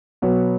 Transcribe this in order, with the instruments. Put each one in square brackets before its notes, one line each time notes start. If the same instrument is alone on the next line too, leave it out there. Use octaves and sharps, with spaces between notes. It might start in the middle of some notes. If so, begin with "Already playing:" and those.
[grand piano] B2 F#3 B3 F#4